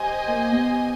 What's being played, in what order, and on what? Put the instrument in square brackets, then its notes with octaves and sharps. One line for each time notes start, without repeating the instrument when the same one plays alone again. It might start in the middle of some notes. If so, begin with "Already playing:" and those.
Already playing: [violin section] G4 C5 D#5 G#5
[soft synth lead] A#3
B3